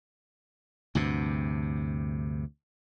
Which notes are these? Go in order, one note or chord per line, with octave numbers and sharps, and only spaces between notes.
D2 G2 C3